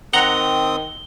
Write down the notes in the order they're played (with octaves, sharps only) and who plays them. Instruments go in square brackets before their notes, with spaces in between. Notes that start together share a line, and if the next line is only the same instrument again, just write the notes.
[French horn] D#3 [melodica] C4 D#6 [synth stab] F#5 A#5 [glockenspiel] G7